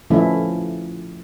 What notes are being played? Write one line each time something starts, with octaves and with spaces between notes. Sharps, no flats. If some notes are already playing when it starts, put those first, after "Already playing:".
F3 A3 C#4 E4